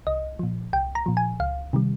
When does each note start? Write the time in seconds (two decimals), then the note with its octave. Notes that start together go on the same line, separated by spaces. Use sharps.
0.07 C2 D#5
0.39 A#2 F3
0.73 C2 G5
0.95 A#5
1.06 A#2 F3
1.17 G#5
1.40 C#2 F5
1.73 C3 D#3 G3